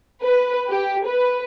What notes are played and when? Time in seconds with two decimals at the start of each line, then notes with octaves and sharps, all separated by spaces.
0.24 B4
0.70 G4
1.07 B4